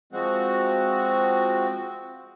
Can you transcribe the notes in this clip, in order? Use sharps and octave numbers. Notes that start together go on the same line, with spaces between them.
F3 G#3 C4 F#4